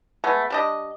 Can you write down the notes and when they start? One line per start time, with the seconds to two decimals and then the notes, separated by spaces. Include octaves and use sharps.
0.24 G#3 A3 B3
0.50 G3 D4 D#5